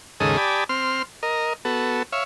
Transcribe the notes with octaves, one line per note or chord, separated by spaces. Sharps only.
D#2 G#2 C#3 G#4 A4 D#5
G4 D5 G#5 A5 B5 D#6
C4 C6 F6
A#4 D#5
B3 F#4 A4
C#5 E5 F5